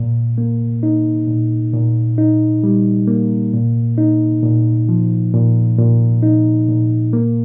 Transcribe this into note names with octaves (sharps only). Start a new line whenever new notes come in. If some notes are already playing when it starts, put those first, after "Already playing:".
Already playing: A#2
A#3
D#4
A#2
A#2
D#4
G3
A#3
A#2
D#4
A#2
F3
A#2
A#2
D#4
A#2
A#3